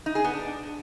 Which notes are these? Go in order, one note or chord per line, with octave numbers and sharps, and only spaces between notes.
D#4
G#4
B3
D4